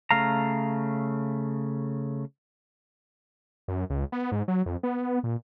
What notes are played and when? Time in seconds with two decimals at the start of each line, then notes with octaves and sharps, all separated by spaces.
0.11 C#3 A3 F5 A#5
3.68 F#2
3.90 C#2
4.12 B3
4.32 G#2
4.48 F#3
4.66 F2
4.83 B3
5.24 A#2